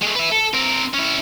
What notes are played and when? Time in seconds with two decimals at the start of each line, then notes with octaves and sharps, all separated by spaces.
0.02 G#3 A3
0.16 B4 E5
0.32 A4
0.54 C4 A#4
0.94 C#4 E4